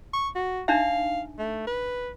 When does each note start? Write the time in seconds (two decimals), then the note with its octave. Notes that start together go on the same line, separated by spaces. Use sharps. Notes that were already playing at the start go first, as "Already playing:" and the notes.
0.13 C#6
0.35 F#4
0.68 D4 D#4 E5 F5
1.39 A3
1.67 B4